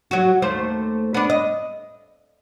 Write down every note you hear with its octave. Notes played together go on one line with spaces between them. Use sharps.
F#3 F#4
D#2 A3 C5
B3 D4
D#5